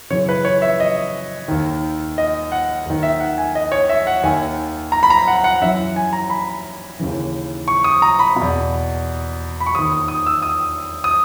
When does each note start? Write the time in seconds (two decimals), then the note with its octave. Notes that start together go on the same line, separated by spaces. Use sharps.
0.10 F#2 C#3 E3 C#5
0.29 B4
0.45 C#5
0.62 E5
0.80 D#5
1.48 D#2 D#3
2.18 D#5
2.52 F#5
2.85 D#2 D#3
3.03 E5
3.20 F#5
3.38 G#5
3.55 D#5
3.72 C#5
3.89 E5
4.07 F#5
4.23 D#2 D#3 G#5
4.92 A#5
5.03 B5
5.10 A#5
5.28 F#5
5.44 F#5
5.61 F#2 E3 E5
5.96 G#5
6.13 A#5
6.30 B5
6.99 D#2 C#3 E3
7.68 C#6
7.84 D#6
8.02 A#5
8.19 B5
8.36 B2
8.41 E2
9.60 B5
9.67 C#6
9.74 D#2 D#6
9.79 D#3
9.92 D#6
10.08 D#6
10.26 E6
10.42 D#6
11.04 D#6